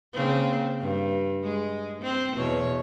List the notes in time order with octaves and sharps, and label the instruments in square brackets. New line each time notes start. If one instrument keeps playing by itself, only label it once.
[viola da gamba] C#3 A#3 C4
G2
G#3
C4
E2 B2 C#5